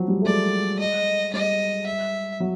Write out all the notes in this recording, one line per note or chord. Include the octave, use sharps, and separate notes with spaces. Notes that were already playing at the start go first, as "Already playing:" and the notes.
Already playing: F3 F#3
G3
A3
G#3 D5
D#5
G3 D#5
E5
F#3